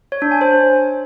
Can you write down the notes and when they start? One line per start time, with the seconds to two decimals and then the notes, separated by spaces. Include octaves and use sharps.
0.12 C#5
0.22 D4
0.32 G#5
0.41 C5